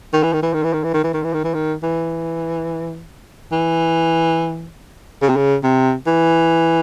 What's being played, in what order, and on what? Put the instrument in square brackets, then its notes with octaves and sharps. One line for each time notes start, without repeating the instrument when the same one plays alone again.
[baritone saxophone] D#3
E3
D#3
E3
D#3
E3
D#3
E3
D#3
E3
D#3
E3
D#3
E3
D#3
E3
E3
C#3
C3
C#3
C3
E3